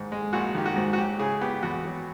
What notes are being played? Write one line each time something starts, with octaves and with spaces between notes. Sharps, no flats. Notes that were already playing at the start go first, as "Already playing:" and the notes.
Already playing: G#2 D#3
G#3
A#1 F#4
D#3 G4
F#4
G#2
F#4
F#3 G4
C#3 G#4
B3 G4
E2 F#4
F#3